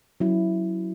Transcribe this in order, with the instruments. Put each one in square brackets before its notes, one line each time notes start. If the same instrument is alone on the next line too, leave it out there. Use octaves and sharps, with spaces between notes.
[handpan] F#3 C#4 E4